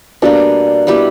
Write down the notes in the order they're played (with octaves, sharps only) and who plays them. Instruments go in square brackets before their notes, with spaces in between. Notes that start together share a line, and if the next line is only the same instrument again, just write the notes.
[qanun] B2 G3 A#3 [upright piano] D4
[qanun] G3 B3 E4 G4